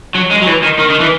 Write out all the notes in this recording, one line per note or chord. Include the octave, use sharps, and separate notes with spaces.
F#3
G#3
F#3
E3
D#3
D#3
D#3
E3